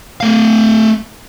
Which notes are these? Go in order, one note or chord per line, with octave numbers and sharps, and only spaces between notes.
A3 F5